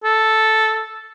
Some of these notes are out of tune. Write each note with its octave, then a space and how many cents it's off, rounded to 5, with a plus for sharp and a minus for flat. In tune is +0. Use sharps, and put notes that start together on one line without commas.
A4 -5